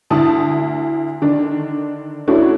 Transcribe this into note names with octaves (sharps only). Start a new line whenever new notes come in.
D2 E4 A5 D#6
D3 D#3 D4
A3 C#4 D4 E4 F#4